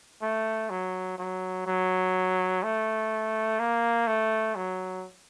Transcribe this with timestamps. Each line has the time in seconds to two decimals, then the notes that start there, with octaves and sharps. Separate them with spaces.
0.22 A3
0.70 F#3
1.18 F#3
1.66 F#3
2.63 A3
3.59 A#3
4.07 A3
4.56 F#3